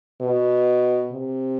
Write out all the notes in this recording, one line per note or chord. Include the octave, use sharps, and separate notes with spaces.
B2
C3